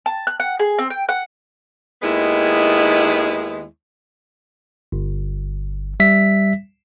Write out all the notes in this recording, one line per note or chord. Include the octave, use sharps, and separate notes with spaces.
A5
F#6
F#5
G#4
C4
G5
F#5
D#2 D#3 G#3 B3 E4
G1
G3 E5 B6